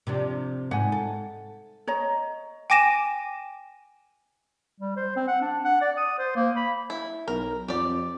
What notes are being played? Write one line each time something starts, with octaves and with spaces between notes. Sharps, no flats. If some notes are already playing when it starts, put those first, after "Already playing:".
C3 F3 D4
G#2 F#5 G#5
A4
C#5 D#5 A#5
G5 G#5 D6 A#6 D#7 E7
G3
C5
C4
F#5
D4
F#5
D5
D#6
C5
A#3
B5
E4
B1 A#4
F2 G4 D5